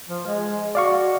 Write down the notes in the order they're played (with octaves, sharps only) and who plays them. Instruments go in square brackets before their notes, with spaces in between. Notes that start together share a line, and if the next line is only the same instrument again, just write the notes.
[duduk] F3
G#3
[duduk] F#4 [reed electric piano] D5 F5 C#6